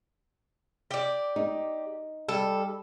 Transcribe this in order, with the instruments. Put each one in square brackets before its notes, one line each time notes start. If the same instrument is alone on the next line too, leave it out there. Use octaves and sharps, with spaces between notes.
[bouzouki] G4 D5
[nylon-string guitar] D#4
[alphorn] G3 [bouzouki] A4